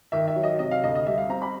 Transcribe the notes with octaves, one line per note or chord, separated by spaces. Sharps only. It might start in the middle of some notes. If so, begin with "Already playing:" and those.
D#3 E5
E5
F#3
D#5
C3 D#5
F5
D2 D#5
D#5
G3 E5
F5
C4 A#5
B5